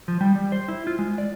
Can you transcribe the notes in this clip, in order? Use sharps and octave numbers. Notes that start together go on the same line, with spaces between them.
F3
G3
G3
C5
E4
F4
G#3
D5